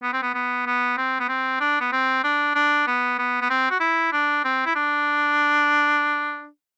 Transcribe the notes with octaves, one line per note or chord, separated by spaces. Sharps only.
B3
C4
B3
B3
B3
C4
B3
C4
D4
B3
C4
D4
D4
B3
B3
B3
C4
F#4
E4
D4
C4
E4
D4